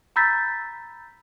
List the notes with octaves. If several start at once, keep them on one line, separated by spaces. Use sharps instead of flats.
A#5 B5 E6 G6 A6 B6